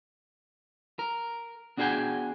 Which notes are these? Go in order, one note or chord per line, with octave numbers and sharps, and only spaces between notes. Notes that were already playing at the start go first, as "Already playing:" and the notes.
A#4
B3 D4 F#4 G#4 G5 G#5